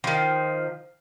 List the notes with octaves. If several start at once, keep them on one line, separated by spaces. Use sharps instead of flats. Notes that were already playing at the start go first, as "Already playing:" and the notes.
D#3 F3